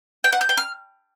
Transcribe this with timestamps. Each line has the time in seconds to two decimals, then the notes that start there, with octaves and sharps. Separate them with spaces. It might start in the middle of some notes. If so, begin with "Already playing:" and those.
0.24 G5
0.33 F#5
0.41 G6
0.49 G5
0.57 F6